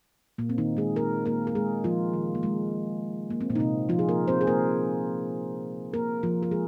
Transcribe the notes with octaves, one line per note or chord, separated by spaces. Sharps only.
A#2 A#3
C4
D#3 D#4
G#3 G#4
A#3 A#4
A#3 A#4
A#4
G#3 G#4
F3 F4
D#3
A#3
G#3
A#3
C4
A#2 A#3
D#4
C3 C4
F3 F4
G#4
A#3 A#4
C4 C5
G#4
A#3 A#4
A#3 A#4
F3 F4
A#4
G#3 G#4